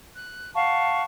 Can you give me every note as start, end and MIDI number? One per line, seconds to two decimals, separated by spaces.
0.15 0.50 90
0.55 1.03 77
0.55 1.03 78
0.55 1.03 81
0.55 1.03 85